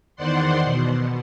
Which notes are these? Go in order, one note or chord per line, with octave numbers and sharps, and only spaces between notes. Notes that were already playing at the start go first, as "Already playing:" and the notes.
E2 D#3 C5 D5 F#5 C6
B2